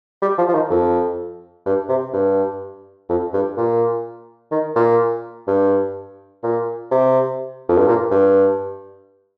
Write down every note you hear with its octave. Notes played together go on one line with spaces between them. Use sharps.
G3
F3
F3
D#3
F2
G2
C3
G2
F2
G2
A#2
D#3
A#2
G2
A#2
C3
F2
G2
A#2
G2